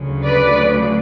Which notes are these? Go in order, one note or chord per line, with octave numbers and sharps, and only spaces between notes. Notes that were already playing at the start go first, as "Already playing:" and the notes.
Already playing: D2 C#3 F#3
B4 D5